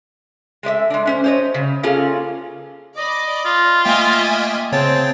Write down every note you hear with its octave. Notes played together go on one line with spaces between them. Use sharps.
G#3 A3 D5 E5
G#3 D4
G#3 C#4 C5
C5 C#5 D#5
C#3
A#3 C#4 F4 G#4 A4
D5 D#5 B5
F4
A3 A#3 D#5 E5 G5 G#5
C#3 C4 C#5 G5 A5